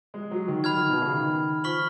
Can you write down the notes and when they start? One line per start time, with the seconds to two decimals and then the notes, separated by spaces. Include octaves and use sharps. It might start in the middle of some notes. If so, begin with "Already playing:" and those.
0.14 G#3
0.31 F#3
0.48 D#3
0.64 F#3 B5 F6 G#6
0.77 D#3
0.90 B2
1.02 C#3
1.14 D#3
1.64 F3 C#6 F6 B6 F#7